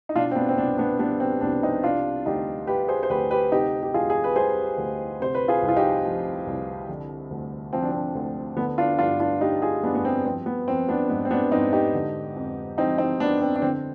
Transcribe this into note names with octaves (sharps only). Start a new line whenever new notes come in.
D#4
B2 D4 F4
C4
B3 D4
C4
C2 B3 D4
B3 D4
G3 B3 D4
C4
C2 B3 D4
C4 D#4
C3 D4 F4
D2 D#4 G4
G3 G4 B4
G#4 C5
C5
D2 G4 B4
G4 B4
C3 D#4 G4
G4
D2 F4 G#4
G#4
B4
G3 G#4 C5
D2
C3 C5
B4
F4 G#4
C2
F4
D#4 G4
F3
C2
D3
D2
F3 C4
D4
C4
D2
D3 B3
D4 F4
G2 D4 F4
D4 F4
G3 D#4 G4
F4 G#4
G2 B3 D4
B3
C4
F3 C4
B3
F3 C4
B3 D4
G#2 B3
C4
B3 D4
G#2 C4 D#4
D#4 G4
D3
F2
F3 C4 D#4
C4 D#4
F2 B3 D4
C4
D4
D3 C4